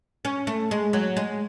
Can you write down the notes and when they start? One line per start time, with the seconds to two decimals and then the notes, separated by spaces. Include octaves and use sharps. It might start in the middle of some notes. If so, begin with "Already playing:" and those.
0.25 C#4
0.47 A3
0.71 G#3
0.93 F#3
1.17 G#3